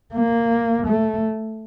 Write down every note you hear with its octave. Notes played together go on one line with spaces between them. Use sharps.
A#3
A3